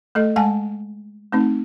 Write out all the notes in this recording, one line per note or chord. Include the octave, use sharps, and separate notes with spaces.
A3 A4 D#5
G#3 F#5 G#5 A5
A3 C4 D#4